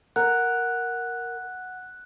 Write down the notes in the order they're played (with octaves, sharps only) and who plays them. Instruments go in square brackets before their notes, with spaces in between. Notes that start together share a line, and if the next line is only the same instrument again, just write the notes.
[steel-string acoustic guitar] A#4 [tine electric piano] F#5 [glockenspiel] F#6